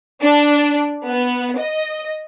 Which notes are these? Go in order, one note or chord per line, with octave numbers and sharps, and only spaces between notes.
D4
B3
D#5